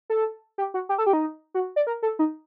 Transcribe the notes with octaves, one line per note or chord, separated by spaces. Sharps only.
A4
G4
F#4
G4
A4
G4
D#4
F#4
D5
A#4
A4
D#4